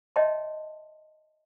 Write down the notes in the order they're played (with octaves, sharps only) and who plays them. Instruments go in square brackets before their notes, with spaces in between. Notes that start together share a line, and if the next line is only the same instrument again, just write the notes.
[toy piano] C#5 D#5 E5 G5 A5 C6